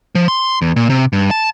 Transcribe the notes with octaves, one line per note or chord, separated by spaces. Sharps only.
F3
C6
E2
A#2
C3
G2
A5